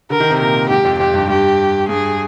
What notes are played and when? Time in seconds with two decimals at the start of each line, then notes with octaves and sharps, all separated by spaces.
0.10 D3 A#4
0.20 D#3
0.31 C3
0.40 A#2 A#4
0.69 G#2 G4
0.85 F2
0.99 F2 G4
1.14 G2
1.29 G2 G4
1.88 G2 G#4